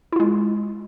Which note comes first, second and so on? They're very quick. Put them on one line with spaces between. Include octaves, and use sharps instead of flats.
E4 F4 G#3